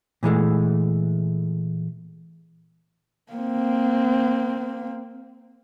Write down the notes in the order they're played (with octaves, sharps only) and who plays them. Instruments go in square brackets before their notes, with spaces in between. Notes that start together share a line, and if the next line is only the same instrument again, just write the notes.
[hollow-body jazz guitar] A#2 E3 G#3 A3
[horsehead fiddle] A#3 C4